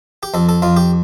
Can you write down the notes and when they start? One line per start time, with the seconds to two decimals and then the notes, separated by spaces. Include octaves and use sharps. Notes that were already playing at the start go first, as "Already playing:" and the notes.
0.23 G4
0.34 F2 A4
0.49 A4
0.62 F2 F4
0.77 G4